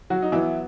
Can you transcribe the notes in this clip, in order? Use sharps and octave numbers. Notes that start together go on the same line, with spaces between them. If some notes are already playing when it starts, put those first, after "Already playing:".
F#3 F#4
D#4
E3 F#3 B3 E4